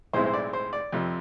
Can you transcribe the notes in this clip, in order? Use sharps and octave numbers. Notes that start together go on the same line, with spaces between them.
B1 A2 G#3 C4 E4 C5
C5
D5
C5
D5
F2 C3 F3